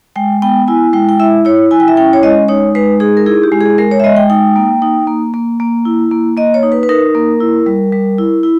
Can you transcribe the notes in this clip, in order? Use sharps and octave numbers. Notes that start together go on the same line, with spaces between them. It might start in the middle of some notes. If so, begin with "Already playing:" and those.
G#3 G5
B3 G5
E4 G#5
G#3 G5
G5
E4 E5
E4 C#5
E4 G#5
G5
E5
C#4 G5
C#5
G#3 D#5
D#4 C#5
G#3 B4
D#4 G#4
A#4
E4 G#4
G4
G#3
G#4
G#3 A#4
C#5
E5
G#3 D#5
G5
D#4 G5
A#3
D#4
A#3
A#3
A#3
E4
A#3
A#3 D#5
C#5
D#4
B4
B4
D#4 A#4
A#3
E4
G3
G3
E4
E4